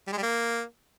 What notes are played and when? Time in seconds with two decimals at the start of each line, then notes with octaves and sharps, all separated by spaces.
0.07 G3
0.13 G#3
0.18 G3
0.23 A#3